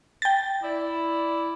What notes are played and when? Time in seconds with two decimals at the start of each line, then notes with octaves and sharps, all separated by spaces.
0.22 G5 A6
0.63 E4 D5